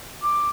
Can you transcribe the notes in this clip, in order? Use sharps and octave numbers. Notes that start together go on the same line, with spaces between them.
D6